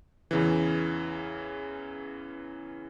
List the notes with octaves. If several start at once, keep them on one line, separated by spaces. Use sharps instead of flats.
E2 C#3 E3